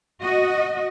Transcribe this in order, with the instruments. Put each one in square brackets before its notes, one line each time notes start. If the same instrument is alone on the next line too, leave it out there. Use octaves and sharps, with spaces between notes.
[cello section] F#4 D#5